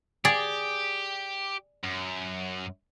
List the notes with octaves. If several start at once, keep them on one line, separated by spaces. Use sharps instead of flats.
G4 G#4 D5
F#2